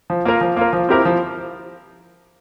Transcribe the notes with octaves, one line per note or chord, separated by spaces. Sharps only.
F3
A#3 F4 A#4
F3
A#3 F4 A#4
F3
C4 E4 G4 A#4
F3